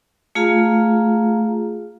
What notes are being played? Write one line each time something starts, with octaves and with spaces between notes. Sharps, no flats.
A3 F4 G#4 F5 A#5